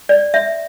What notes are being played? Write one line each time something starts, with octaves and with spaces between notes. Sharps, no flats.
D5
E5